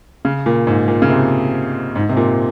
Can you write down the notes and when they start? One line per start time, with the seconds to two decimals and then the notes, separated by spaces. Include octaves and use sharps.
0.25 C#3
0.46 A#2
0.67 G#2
0.88 A#2
1.02 C#3
1.09 C3
1.95 G#2
2.09 C3
2.16 A#2